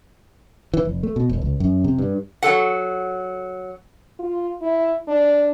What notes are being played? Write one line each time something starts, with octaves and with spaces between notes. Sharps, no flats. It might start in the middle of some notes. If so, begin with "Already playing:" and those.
E3
F1
A3
B2
E1
C#2
F#2
C3
G2
F#3 A4 F#5
F4
E4
D4